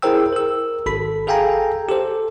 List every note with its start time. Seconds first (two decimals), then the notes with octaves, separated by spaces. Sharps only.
0.02 E4 G#4 A#4 C5 G5 E6
0.33 A#4 E6
0.86 G#1 A4 B5 B6
1.27 G#4 A4 F5 G5 G#5 A#5
1.89 G4 A4 C5